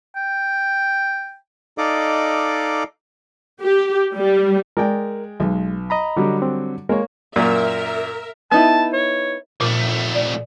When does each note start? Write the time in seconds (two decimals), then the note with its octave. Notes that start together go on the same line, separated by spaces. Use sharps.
0.16 G5
1.78 D#4 A4 D5 D#5 F5 D6
3.61 G4
4.15 G3
4.77 G#3 A#4 D5 G5
5.40 B1 G#3
5.90 D#5 A#5 B5
6.17 D3 F#3 G3
6.42 C4
6.89 G#3 A#3 A#4 C#5
7.36 F#2 A#2 A#4 E5
8.51 B3 D#4 E4 A5
8.93 C#5
9.61 A#2 F3 A3
10.15 D5